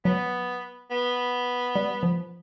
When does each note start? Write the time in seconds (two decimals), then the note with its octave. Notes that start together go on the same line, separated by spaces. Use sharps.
0.05 F#3 B3
0.91 B3
1.75 G3
2.03 F3